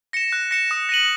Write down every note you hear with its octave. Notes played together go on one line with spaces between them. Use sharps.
A#6 C#7 E7
F#6
A#6 C#7 E7
D#6
A#6 D#7 F#7